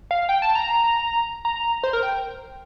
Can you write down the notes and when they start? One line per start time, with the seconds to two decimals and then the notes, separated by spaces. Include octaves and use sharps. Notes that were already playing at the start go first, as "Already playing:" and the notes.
0.11 F5
0.29 G5
0.42 A5
0.55 A#5
1.45 A#5
1.83 C5
1.93 A#4
2.03 G5